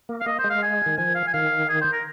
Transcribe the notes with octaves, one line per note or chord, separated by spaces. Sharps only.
A#3
F5
A#3 D#5
C5
G#3
F5
G#5
D#3
F3 G#5
F5
G#5
D#3 F5
G#4
C5
A#4